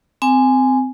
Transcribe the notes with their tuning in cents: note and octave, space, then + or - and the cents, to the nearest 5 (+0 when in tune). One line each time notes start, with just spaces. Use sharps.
C4 -20 G#5 +0